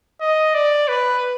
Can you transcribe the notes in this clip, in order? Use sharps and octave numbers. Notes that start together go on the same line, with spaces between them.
D#5
D5
B4